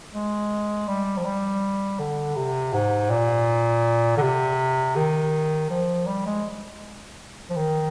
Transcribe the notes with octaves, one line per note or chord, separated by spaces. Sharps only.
G#3
G3
F3
G3
D3
C3
G#2
A#2
D3
C3
D#3
F3
G3
G#3
F3
D#3